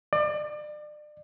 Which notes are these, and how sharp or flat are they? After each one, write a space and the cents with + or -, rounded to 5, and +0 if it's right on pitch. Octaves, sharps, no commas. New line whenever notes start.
D5 +35